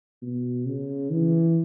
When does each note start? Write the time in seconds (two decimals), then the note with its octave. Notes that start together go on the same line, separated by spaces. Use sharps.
0.23 B2
0.66 C#3
1.10 E3